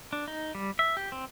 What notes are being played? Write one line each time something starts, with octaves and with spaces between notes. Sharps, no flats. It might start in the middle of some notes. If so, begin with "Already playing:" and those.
D4
D#4
G3
E5
G4
C4